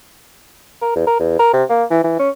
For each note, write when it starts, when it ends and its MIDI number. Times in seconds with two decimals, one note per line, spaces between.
0.82 0.92 70
0.95 1.06 40
1.07 1.16 70
1.20 1.34 40
1.40 1.49 70
1.53 1.64 48
1.70 1.84 58
1.91 2.00 52
2.04 2.16 52
2.19 2.30 61